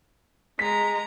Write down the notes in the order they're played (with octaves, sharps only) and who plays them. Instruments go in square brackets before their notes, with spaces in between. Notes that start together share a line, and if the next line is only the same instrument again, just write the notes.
[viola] G#3 A#5 [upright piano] B6